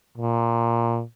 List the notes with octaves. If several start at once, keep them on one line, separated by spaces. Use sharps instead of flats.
A#2